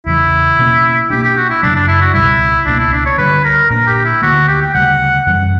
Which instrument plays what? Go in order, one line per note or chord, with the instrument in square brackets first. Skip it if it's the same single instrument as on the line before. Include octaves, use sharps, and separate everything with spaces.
[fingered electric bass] E2 C#3 E3 [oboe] E4
[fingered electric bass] B2 A#3 C#4
[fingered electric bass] B2 A#3 D4 [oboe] G4
[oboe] G4
F#4
E4
[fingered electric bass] F#2 C#3 F#3 [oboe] D4
[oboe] D4
E4
F#4
[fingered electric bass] C#2 B2 G3 [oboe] E4
[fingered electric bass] C#2 B2 A#3 [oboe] D4
[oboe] E4
D4
C#5
[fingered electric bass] G2 D3 G3 [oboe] B4
[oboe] A#4
[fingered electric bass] A#2 A#3 D4 [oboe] A#4
[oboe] G4
E4
[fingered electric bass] D2 D3 A#3 [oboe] F#4
[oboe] G4
G5
[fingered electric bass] D2 C#3 G3 [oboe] F#5
[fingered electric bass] F#2 E3 G3 C#4 [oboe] F#5